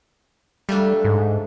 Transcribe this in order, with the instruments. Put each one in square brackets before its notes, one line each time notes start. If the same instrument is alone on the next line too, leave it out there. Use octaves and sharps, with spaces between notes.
[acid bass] G3 [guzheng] A3 A#3 D4
[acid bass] G#2